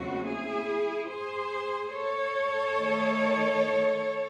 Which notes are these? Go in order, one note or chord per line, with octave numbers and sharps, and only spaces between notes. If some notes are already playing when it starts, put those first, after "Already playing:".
Already playing: D#2 C#3 F#3 A3 C4 F#4
E4 G#4
G#4 C5
A4 C#5
D#3 A3 D#4